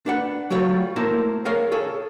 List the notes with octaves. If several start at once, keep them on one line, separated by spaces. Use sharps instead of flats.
D4 B4 F#5
F#3 G3 A3 F4 C#5
A3 A#3 E4 A#4 C5
G#4 A#4 C#5 F5
G#4 A4 C#5